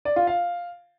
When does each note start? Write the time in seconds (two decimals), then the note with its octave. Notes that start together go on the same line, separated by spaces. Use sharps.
0.05 D5
0.16 F4
0.27 F5